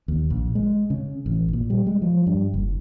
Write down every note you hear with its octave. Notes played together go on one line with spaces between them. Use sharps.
D#2
A#1
G#3
C#3
A1
A#2
G3
G#3
F3
G2
F#1